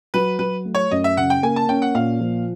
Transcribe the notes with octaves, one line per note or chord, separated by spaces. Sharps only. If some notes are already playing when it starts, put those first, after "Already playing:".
F#3 B4
F#3 B4
A3
C#5
F#2 D#5
E5
C#3 F#5
G5
A#3 G#5
A5
C#4 G5
F#5
A#2 F5
F3